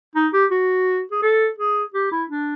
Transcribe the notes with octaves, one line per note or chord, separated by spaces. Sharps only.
D#4
G4
F#4
G#4
A4
G#4
G4
E4
D4